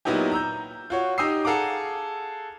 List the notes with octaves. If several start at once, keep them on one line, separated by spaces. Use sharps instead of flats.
A#2 F#3 B3 D#4 E4 G4
A#5 E6 G6
F4 F#4 C#5
D#4 G4 D#6 E6 C7
G#4 A4 F5 F#5 A#5 D6